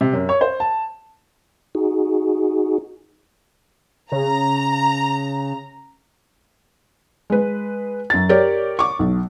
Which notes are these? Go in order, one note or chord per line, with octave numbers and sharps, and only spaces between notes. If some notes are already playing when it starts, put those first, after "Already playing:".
C3
F#2
C#5
C5
A5
D#4 F#4 G#4
C#3 A#5
G#3 B4
F#2 A6
G4 A#4 C#5 D5
C#6 D6
B1